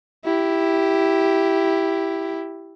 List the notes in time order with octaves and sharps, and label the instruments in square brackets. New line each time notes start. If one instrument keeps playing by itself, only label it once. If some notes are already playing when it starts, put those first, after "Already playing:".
[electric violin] E4 G4